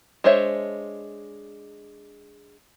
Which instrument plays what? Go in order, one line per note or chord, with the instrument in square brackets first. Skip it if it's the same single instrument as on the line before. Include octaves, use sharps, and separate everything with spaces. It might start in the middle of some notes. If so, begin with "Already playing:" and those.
[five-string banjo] G#3 D4 C5 C#5 E5